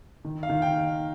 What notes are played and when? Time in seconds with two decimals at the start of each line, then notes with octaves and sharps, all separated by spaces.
0.25 D#3
0.43 F5
0.49 D#3
0.62 G5